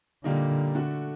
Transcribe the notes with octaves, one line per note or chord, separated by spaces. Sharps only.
A#2 D3 G3 A#3 D#4
D3 A3 D4 F#4